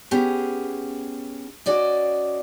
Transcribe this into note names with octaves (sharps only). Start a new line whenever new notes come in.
B3 C#4 G4 G#4
C#4 F#4 D5 D#5